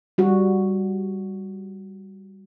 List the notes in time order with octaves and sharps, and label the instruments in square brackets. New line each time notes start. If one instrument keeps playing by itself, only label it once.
[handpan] G3 F#4